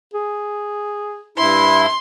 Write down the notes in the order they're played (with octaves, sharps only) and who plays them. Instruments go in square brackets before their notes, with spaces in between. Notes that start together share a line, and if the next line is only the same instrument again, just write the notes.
[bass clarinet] G#4
[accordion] G2 E4 [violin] C6